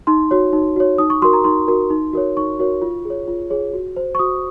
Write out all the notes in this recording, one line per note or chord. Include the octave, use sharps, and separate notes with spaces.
D#4 C6
F#4 C#5
D#4
F#4 C#5
D#4 D#6
C#6
F#4 A#4 C6
A#5
D#4 C6
F#4 A#4
D#4
F#4 A#4 C#5
D#4 C#6
F#4 A#4 C#5
F4
G#4
C#5
F4
G#4 C#5
F#4
C5
C#6
F#4 D#6